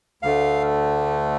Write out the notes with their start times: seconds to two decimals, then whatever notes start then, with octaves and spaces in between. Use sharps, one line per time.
0.23 D2 D3 A3 F5